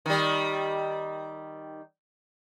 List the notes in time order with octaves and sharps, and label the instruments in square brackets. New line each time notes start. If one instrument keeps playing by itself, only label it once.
[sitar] D#3 G3